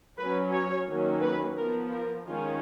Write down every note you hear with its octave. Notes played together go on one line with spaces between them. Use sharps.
F#3 C#4 B4
C#5
D#3 F#3 A#3 C#4
B4
F3 B3 A#4
A#4
D#3 G#3 C#4 F4